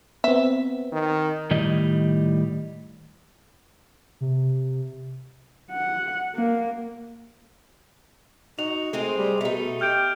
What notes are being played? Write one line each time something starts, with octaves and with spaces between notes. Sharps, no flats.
B3 C4 E5
D#3
A2 D#3 G3 D#5
C3
F#5
A#3
D#4 F#4 F7
G#3 A3 C4 G#4
G3
B2 A3 D#4
G4 F6 G6 D7